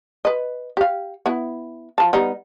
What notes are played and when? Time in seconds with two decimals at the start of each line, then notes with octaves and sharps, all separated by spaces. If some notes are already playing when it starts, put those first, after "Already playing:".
0.25 B4 D#5
0.77 G4 F5
1.26 B3 E4
1.98 F3 A5
2.13 G3 B3 D#4